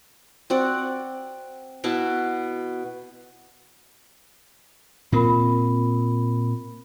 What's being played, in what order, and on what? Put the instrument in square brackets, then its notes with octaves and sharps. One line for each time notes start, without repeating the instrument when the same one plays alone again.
[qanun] C4 F#4 D5 F#5
B2 E4 F#4 A5
[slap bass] A#2 C4 [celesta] F4 A#4 B5